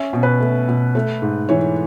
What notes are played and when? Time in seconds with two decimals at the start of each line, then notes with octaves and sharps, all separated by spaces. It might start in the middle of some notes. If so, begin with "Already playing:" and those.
Already playing: C#4 E5
0.13 B2
0.23 B4
0.40 A3
0.68 B2
0.95 A3
1.22 G#2
1.49 E3 C#5